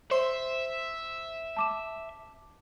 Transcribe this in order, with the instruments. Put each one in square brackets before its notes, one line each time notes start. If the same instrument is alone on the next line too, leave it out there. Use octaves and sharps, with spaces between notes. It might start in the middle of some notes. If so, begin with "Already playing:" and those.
[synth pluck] C5 C6 [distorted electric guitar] E5
[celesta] A5 D6 E7